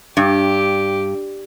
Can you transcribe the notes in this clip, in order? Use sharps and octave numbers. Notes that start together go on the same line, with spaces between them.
G2 G4